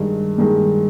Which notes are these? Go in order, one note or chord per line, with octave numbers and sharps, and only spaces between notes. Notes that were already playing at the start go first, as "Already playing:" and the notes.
Already playing: G2 D#3 G#3
G2 D#3 G#3